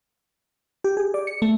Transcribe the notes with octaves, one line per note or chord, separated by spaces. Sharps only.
G4
G#4
D5
C#7
A3